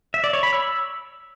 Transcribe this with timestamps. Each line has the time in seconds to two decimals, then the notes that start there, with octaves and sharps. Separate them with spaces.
0.14 E5
0.24 D5
0.33 C#5
0.43 B5
0.53 E6